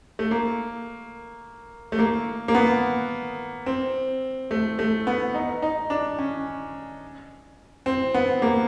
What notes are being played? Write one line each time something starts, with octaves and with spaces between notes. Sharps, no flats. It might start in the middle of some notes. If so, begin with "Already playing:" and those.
A3
A#3
A3
A#3
A#3
B3
C4
A3
A3
B3
D#4
D#4
D4
C#4
C4
B3
A#3